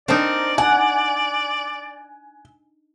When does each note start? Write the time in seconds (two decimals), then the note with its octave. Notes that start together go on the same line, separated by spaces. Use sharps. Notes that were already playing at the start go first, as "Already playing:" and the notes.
0.08 C4 D4 D#4 A#4 D5
0.58 F#5 G#5